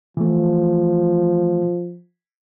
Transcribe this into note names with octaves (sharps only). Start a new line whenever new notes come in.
E3 F3 A3